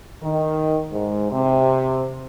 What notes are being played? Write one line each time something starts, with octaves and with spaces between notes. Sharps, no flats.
D#3
G#2
C3